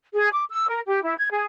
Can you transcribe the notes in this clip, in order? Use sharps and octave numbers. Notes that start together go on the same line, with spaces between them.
G#4
D6
E6
A#4
G4
E4
G#6
G#4